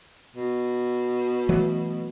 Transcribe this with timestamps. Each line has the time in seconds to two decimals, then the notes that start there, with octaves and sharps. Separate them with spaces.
0.36 B2
1.49 E3 F#3 A3